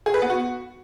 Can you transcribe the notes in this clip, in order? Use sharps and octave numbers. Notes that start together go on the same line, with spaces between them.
G#4
B4
B3
F#4